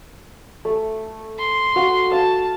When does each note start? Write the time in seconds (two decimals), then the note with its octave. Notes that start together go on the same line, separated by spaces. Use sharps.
0.65 A3
1.38 C6
1.76 F#4 F5
2.12 F5 A5